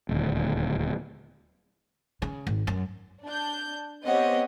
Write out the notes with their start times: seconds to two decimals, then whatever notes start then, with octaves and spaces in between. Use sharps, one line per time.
0.09 D#1 D2
2.22 C#3
2.47 G#1
2.67 F#2
3.25 D4 G6
4.04 B3 C4 G4 C#5 D#5 F#5